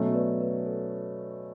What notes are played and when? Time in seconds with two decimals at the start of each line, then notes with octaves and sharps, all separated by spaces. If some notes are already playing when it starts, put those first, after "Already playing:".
Already playing: B2 F#3 A3 C#4 C#5 E5
0.15 B4 D5
0.41 B4
0.66 A4